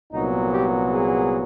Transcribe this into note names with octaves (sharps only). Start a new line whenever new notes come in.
C2 A#2 F#3 B3 D#4
G4
G#4